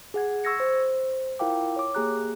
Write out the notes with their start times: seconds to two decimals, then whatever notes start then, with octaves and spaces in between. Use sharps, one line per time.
0.14 G#4 F#5 G#6
0.44 C#6 E6 G#6 A#6 C#7
0.60 C5
1.39 E4 F4 A#4 F5 G5 D6
1.76 C#5 D6
1.95 A#3 G4 G#4 A#5 F#6